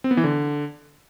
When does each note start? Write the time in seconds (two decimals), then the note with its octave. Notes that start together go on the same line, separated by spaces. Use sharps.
0.04 C4
0.11 B3
0.17 E3
0.24 D3